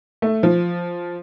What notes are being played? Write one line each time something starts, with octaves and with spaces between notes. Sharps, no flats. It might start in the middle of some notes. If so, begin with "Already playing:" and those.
A3
F3